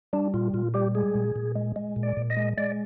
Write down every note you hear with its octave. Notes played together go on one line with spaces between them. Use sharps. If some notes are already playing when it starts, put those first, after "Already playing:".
G3 D4
A#2 F4
A#2 F4
G3 G4
G#3 G#4
A#2
A#2
G#3
G#3
A#2
D5
A#2
D#5
G#3
G#3 D5